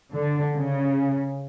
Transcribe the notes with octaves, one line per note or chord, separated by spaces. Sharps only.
D3
C#3